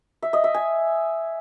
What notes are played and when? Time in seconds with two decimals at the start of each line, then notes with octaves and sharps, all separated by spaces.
0.22 E5
0.33 D#5
0.44 E5
0.54 G#5